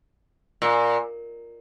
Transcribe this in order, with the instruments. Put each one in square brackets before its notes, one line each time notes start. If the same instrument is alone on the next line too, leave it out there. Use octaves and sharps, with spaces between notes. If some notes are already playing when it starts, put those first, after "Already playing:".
[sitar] A#2